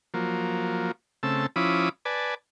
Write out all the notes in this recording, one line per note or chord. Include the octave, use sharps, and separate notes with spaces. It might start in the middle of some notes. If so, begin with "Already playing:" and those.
F3 F#3 A#3
C#3 A3 C4 A5 E6
F3 C#4 E4 B5 D6 D#6
B4 D5 G#5 A5